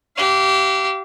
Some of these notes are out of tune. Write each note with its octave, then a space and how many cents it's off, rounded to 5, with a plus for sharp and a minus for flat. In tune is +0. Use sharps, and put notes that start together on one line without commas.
G4 -25 F5 -35